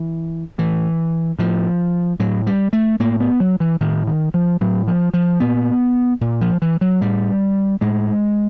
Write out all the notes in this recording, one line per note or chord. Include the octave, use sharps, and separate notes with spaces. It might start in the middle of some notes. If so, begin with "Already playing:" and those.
Already playing: E3
A2 E3
A2 F3
A2 F#3
G3
A3
A2 A#3
B3
F#3
E3
A2 D#3
D#3
F3
A2 F#3
F3
F3
A#2 B3
A#2
F3
E3
F#3
A2 G3
A2 G#3